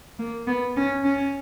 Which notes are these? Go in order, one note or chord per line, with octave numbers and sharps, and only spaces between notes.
A#3
B3
C#4
C#4